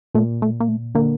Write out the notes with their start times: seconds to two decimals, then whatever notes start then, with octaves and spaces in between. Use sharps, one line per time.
0.15 A#2 A3
0.42 A3
0.60 A#3
0.68 A3
0.95 D3 A#3